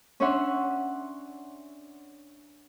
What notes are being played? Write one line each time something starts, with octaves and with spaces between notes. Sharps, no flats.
C#4 D4 C#5 E5 F#5 C6